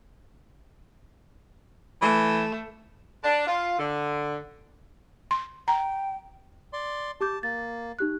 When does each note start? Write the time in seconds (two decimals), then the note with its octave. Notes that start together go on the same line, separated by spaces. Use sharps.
2.02 E3 A3
3.24 D4
3.47 F4
3.78 D3
5.31 C6
5.68 G5 A#5
6.73 D5 C6
7.21 G4 A5 D6 G6
7.43 A#3 A6
7.99 D#4 G4 F#6